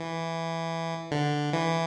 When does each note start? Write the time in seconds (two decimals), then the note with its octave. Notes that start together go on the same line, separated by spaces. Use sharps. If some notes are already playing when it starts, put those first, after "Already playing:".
Already playing: E3
1.11 D3
1.53 E3